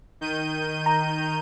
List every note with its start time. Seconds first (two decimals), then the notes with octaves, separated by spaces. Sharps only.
0.21 D#3 G6 D#7
0.86 A#5